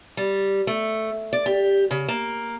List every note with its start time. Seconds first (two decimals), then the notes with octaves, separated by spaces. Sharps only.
0.17 G3
0.67 A3
1.33 D5
1.46 G4
1.91 C#3
2.08 A#3